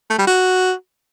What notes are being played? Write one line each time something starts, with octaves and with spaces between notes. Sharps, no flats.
A3
G3
F#4